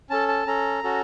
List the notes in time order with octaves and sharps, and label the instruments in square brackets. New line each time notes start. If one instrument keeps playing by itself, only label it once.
[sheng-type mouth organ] C#4 A4 A5
A5
C#4 A4 A#5
C#4 F#4 A4